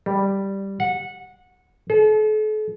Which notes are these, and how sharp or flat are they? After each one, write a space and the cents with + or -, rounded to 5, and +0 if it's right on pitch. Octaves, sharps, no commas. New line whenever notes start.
G3 +0
F#5 -20
A4 -40